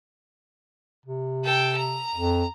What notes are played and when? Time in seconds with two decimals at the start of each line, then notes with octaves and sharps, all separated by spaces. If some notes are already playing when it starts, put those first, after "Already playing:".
1.06 C3
1.44 A4 G5
1.77 A#5
2.15 F2